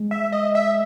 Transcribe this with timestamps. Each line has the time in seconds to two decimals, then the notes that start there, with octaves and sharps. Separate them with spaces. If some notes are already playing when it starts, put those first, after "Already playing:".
Already playing: G#3
0.11 E5
0.32 D#5
0.55 E5